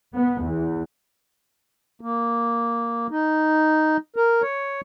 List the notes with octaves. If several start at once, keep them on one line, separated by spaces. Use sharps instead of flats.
B3
E2
A#3
D#4
A#4
C#5